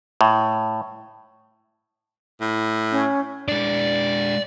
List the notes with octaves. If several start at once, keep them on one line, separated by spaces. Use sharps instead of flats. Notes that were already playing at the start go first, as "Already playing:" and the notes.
A2
A2
C#4
G#3 D4 D5